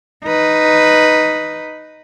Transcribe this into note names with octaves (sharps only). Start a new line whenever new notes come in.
D#4 B4